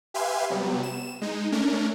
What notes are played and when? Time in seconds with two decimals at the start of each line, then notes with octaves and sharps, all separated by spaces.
0.14 G4 B4 E5 F5 G#5 C6
0.50 C3 F#3 G3 B3
0.83 E7
1.22 G#3 D#4
1.52 A3 C#4 D4 A#4